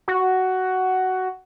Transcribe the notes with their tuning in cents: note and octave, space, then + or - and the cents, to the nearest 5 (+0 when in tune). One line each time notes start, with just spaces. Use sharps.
F#4 +10